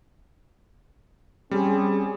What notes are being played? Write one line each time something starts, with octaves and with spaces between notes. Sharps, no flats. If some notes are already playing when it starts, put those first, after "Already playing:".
G3 C4 C#4 G#4